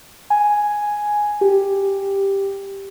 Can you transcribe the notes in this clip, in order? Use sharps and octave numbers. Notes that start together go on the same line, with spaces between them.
G#5
G4